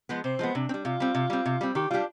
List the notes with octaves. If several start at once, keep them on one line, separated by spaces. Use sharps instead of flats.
F3 G#3 B3
C3 C4
F3 G#3 B3
C3 D4
C4
G3
C3 F4
G3 C4
C3
G3 C4
C3
G3 C4
D#3 G4
G3 D4 F4 G4